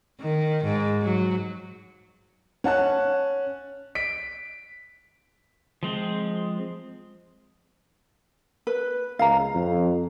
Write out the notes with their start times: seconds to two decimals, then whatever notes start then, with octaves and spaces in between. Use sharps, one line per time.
0.20 D#3
0.64 G#2
1.02 F#3
2.64 C#4 F#5 A5 F#6
3.95 B6 D7
5.83 F3 G#3 C4
8.67 B4
9.19 C#2 F5 A#5
9.54 F2